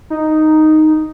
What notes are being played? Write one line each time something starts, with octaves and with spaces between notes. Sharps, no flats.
D#4